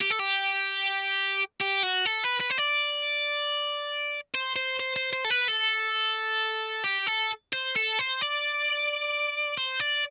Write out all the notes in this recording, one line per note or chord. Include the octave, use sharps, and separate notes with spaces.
G4
A4
G4
G4
F#4
A4
B4
B4
C5
D5
C5
C5
C5
C5
C5
A4
B4
A4
G4
A4
C5
A4
C5
D5
C5
D5